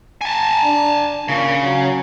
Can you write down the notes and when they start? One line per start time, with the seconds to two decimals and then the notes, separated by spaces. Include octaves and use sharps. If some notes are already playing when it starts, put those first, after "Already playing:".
0.21 G#5 A5
0.64 D4
1.28 A#2 C#3
1.63 F#3